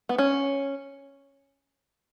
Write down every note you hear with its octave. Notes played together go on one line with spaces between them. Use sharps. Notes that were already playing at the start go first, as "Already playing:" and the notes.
B3
C#4